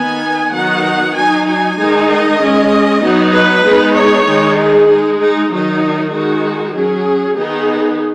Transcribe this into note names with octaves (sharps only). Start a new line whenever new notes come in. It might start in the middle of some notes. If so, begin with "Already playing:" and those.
Already playing: D#3 B3 D#4 G#5
D#3 F#3 B3 D#4 F#5
F#3 D#4 G#5
G#5
D#3 G#3 D#4
D#5
G#3 C#4
F#3 B3 D#4
B4
G#3 B3 D#4
C#5
D#3 G#3 D#4
G#4
G#3 D#4
D#4
D#3 F#3 D#4
D#3 G#3 D#4 F#4
F#3 C#4 G#4
D#3 B3 D#4 G#4